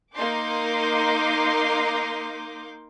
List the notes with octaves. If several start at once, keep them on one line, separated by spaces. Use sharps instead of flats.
A#3 D#4 C6 D6 G6